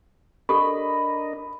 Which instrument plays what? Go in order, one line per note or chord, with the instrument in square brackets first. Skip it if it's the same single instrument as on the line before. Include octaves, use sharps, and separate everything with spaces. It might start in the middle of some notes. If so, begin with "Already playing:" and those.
[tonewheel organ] D4 A#4 D#5 [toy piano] G4 A4 [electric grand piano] B5